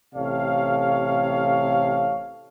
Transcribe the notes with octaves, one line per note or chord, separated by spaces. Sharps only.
A1 C3 A4 C#5 F5